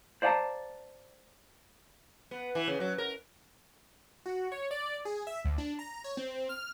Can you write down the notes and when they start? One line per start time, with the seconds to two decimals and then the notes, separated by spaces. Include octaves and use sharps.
0.22 C5 D5 F5 F#5 A5 A#5
2.31 B3
2.55 E3
2.68 C#3
2.80 F#3
2.98 A#4
4.26 F#4
4.52 C#5
4.71 D5
5.05 G#4
5.27 E5
5.45 D2
5.58 D4
5.79 A#5
6.04 C#5
6.17 C4
6.49 F6